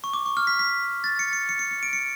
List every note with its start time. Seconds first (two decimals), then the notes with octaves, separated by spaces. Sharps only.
0.04 C#6
0.14 D6
0.26 C#6
0.37 F6
0.47 B6
0.59 B6
1.04 A6
1.19 C#7
1.33 C#7
1.49 C#7
1.59 C#7
1.71 C#7
1.83 D7
1.93 C#7